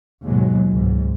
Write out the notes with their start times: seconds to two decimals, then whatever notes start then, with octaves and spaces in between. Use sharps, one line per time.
0.24 D#2 G#2 B2 F#3 G#3
0.73 C#2 G#2